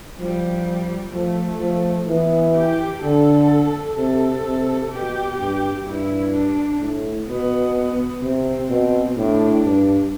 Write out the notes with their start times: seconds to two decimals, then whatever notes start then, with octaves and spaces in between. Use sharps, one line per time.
0.19 F3 G3
1.13 F3 A3
1.60 F3
2.08 E3 B3
2.55 G4
3.02 D3 A4
3.96 C3 A4
4.44 C3
4.92 B2 G4
5.38 G2
5.86 G2 E4
6.33 D4
6.80 A2
7.28 B2 B3
8.22 C3 C4
8.69 B2
9.16 A2 D4
9.63 G2